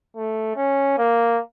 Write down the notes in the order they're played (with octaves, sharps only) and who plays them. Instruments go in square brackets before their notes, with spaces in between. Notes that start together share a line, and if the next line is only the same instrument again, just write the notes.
[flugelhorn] A3
C#4
A#3